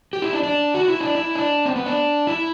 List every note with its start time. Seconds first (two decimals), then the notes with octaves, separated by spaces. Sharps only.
0.13 G4
0.22 E4
0.33 D4
0.43 D4
0.74 F#4
0.88 E4
1.01 D4
1.15 E4
1.35 D4
1.66 C4
1.76 B3
1.86 D4
2.27 E4